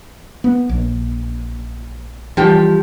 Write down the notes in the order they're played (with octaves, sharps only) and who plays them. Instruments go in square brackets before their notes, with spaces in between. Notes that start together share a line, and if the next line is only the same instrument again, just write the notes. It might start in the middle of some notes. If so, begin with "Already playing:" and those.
[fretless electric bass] B3
A#1
[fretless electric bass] E3 G3 [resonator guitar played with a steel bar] F3 G4